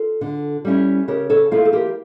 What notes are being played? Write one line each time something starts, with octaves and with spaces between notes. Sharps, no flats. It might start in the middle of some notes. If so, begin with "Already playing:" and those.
Already playing: F4 A4
D3
G3 C#4 E4
C#3 G4 A#4
A4 C#5
F3 A#3 E4 F4 A4
A4
G4 A#4